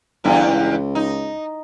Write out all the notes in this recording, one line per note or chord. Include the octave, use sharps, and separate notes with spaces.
G1 E2 G2 E4
C#2
D#4